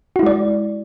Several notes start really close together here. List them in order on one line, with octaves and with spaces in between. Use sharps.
F#4 E4 G#3 D5